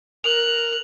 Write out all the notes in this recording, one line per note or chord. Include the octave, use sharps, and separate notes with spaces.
A#4 F#6 F7